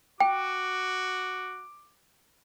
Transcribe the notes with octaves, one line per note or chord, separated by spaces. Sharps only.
F#4 G5 D6